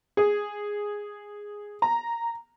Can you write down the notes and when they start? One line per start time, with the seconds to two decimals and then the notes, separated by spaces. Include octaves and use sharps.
0.17 G#4
1.82 A#5